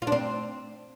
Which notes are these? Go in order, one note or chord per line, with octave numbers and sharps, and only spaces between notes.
F4
D4
C4